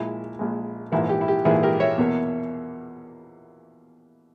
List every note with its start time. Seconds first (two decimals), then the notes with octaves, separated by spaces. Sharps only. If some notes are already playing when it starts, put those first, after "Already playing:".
Already playing: A#1 A#2 G#3 E4
0.39 A#1 A#2 G#3
0.92 A#1 G#2 E3 A#3 E4
1.09 G4
1.21 E4
1.28 G4
1.45 A#1 G#2 E3 A#3 E4 G#4
1.63 G4 A#4
1.80 C#5 E5
1.98 E2 B2 A#3